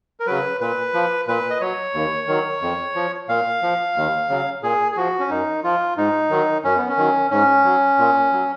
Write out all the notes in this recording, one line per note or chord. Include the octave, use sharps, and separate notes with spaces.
A#4
C#3 F#3 B4
A#2 B4
F3
A#2 B4
D#5
F#3 C#5
D#2
D#3 F#3
F2
F3
A#2 F5
F3
D#2
C#3 F#3
A#2 G#4
G#4
F3 F#4
C#4
F#2 D#4
F3 F4
G#2 D#4
D#3 F#3
F#2 C#4
B3
C#4
D#3 F#3
G#2 C#4
F#3
A#2
F#3